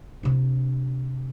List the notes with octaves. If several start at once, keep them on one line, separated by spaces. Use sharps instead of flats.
C3 D4